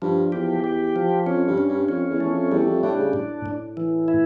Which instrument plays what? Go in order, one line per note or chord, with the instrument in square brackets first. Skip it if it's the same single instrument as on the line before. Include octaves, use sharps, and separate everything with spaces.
[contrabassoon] G2 [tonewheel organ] F3
[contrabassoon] E2 [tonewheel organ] G4
[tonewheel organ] G4
F3
[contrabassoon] F2 [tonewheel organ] C#4
[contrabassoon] G2
[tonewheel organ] C#4
[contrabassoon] G2
[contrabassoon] F2 [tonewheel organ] C#4
[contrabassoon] E2
[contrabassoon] E2 [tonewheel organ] A3
[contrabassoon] F2
[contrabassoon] E2 [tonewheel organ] G3
[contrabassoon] F2
[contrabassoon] A2 [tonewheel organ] D4
[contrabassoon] C#3
[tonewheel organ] A2
A2
E3
E4